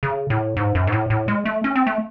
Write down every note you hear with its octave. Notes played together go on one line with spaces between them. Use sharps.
C#3
A2
G#2
F#2
G#2
A2
A2
G#3
A3
C#4
C4
A3